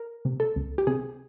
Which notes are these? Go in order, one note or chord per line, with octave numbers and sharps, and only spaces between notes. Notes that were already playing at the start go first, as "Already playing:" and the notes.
Already playing: A#4
C3
A4
C#2
G4
C3 G#4